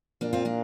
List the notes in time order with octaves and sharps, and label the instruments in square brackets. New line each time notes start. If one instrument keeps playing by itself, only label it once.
[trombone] A#2 [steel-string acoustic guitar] A#3 D4
[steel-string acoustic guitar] C4 F4
A#3 D4